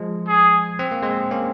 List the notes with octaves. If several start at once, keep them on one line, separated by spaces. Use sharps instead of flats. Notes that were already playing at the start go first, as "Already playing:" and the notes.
Already playing: F3 G#3
G#4
C4
A#3
G#3 C4
A#3 C#4